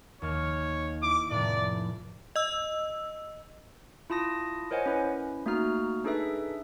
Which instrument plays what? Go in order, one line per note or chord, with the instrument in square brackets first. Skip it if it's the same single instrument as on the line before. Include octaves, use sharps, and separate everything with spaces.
[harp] D#2 F6 [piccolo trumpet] C#5
[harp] E4 [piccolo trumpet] D6
[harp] F1 A2 [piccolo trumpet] D5
[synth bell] D#5 E6
[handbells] E4 F4 A5 D#6 A#6
A#4 C5 C#5 D#5 F#5 G#5
C#4 E4 B4
A3 A#3 D#4 F#4 A#5 F6
D4 D#4 G#4 A4 B4 E5